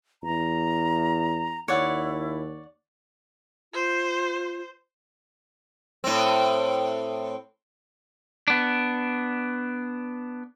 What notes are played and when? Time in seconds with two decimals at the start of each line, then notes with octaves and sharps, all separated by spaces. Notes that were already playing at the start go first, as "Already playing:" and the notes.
0.23 E2 A#5
1.68 D#2 E4 C#5 D5 F#5
3.74 F4 C5
6.04 A2 C4
8.48 B3 D4